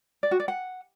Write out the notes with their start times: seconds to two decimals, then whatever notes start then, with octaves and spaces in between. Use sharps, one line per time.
0.23 D5
0.31 F#4
0.40 D5
0.48 F#5